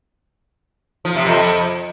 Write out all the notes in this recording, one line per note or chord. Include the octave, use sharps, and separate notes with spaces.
F3
C3
F2